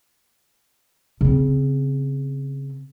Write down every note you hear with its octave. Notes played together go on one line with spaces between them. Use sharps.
C#3 C4